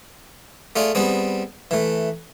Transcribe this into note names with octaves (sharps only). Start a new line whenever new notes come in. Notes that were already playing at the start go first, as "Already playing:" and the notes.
A3 F4 G#4 D5
G3 B3 C4 G#4
E3 A3